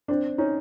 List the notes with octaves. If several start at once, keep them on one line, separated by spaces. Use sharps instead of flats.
C4 D4
C#4 D#4